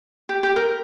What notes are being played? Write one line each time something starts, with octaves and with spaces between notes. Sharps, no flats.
G4
G4
A#4